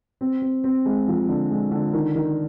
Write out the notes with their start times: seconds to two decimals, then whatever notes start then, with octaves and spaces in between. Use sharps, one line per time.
0.21 C4
0.42 C4
0.64 C4
0.86 G#3
1.08 F3
1.29 D3
1.51 G#3
1.72 D3
1.93 D#3
2.16 D#3